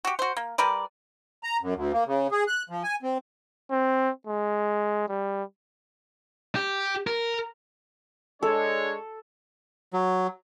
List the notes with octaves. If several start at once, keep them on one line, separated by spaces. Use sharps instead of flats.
F#4 G4
F#4 C5
A#3
G3 A#4 B4 D5
A#5
F#2
D2
A#3
C#3
G#4
F#6
F3
G#5
C4
C4
G#3
G3
G4
A#4
G#3 D4 A4 C#5
F#3